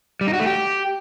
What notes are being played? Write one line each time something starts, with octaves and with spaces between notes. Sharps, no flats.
G3
D#4
F#4
A3
G4